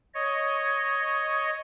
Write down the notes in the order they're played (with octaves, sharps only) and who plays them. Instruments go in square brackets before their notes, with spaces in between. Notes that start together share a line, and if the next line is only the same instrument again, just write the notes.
[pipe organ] C#5 D#5